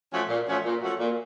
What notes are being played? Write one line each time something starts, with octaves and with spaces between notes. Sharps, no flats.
F3 A3 C#4 F#4
A#2
F3 A3 C#4 F#4
A#2
F3 A3 C#4 F#4
A#2